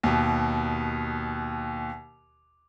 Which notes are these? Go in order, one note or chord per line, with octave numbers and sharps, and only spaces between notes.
D#2 B2